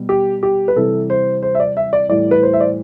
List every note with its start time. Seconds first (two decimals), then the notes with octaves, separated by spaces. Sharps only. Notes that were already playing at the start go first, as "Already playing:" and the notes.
Already playing: B2 G3
0.09 G4
0.43 G4
0.68 B4
0.76 C3 E3 G3 A4
1.10 C5
1.43 C5
1.55 E5
1.60 D5
1.77 E5
1.93 D5
2.09 A2 E3 G3 D5
2.31 B4
2.43 C5
2.53 E5
2.60 D5